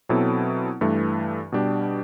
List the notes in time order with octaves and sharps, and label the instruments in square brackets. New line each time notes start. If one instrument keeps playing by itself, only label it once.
[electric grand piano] B2 F#3 C4 E4 A4
G2 E3 A3
B2 G3 D4 G4